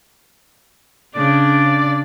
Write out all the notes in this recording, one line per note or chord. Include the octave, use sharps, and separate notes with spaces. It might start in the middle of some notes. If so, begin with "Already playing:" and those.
C#3 D4 D5